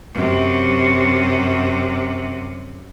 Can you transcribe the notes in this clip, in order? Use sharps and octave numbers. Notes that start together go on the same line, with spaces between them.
F#2 C3